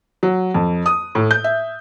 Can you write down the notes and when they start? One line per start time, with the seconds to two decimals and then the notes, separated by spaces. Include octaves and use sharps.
0.23 F#3
0.54 F2
0.86 D#6
1.15 A2
1.31 G6
1.44 E5